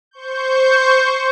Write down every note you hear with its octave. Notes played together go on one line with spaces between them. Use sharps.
C5 C#6 G6